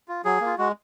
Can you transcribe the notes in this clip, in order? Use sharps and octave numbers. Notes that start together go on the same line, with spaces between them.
F4
F#3 G#4
A#3 F4
G#3 F#4